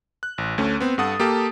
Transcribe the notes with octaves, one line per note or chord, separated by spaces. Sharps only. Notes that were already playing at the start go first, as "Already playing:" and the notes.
F#6
A1
D2 A3 C#4
B3 C4
G2 A4 F#5 D#6 A6
A#3 G4 A4 A5